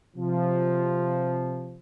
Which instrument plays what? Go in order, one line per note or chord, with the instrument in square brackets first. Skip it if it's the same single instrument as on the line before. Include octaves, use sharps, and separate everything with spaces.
[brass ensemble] C3 F3